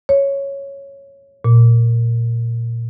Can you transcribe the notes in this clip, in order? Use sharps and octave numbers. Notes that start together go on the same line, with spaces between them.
C#5
A#2